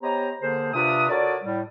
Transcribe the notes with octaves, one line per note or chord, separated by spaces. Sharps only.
B3 G4 C5 C#5 D#5 A#5
D3 A#3 G#4 A#4 C5
C3 D4 F4 B4 E5 D#6
F#4 A4 A#4 C#5 D5
A2 G3